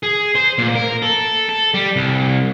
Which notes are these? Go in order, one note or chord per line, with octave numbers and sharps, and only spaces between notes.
G#4
C5
A#2
A#4
A4
A4
G3
C2